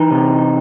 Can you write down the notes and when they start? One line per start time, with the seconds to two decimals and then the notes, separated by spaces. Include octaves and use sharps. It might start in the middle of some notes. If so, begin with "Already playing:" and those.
Already playing: E3 D#4
0.11 C3